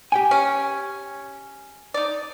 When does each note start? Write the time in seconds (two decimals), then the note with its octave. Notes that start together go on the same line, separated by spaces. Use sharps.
0.12 G4 G5 G#5
0.31 C#4
1.94 D#4 D5